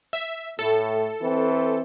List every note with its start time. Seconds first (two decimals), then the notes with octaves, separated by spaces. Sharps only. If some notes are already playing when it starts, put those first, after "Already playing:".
0.13 E5
0.59 A2 A4
1.21 E3 C4